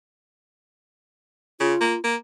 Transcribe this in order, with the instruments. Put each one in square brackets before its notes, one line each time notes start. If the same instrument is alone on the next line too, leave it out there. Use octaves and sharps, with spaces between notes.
[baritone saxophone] C#3 [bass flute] F4
[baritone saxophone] A#3
A#3